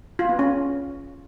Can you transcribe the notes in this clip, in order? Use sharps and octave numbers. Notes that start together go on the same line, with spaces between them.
F4
B3
C#4